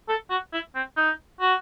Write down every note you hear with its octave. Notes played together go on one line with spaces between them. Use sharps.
A4
F#4
E4
C4
D#4
F#4